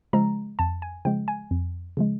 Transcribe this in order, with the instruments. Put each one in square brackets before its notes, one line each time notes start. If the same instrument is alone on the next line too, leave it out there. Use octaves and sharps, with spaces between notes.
[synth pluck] C#3 F3 G#3 A#5
F2 A5
G#5
C#3 F3 G#3 G5
G#5
F2
C#3 F3 G#3